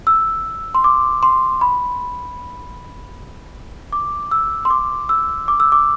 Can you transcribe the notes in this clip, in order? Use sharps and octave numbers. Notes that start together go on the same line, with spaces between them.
E6
C6
D6
C6
B5
D6
E6
C6
D6
E6
D6
E6
D6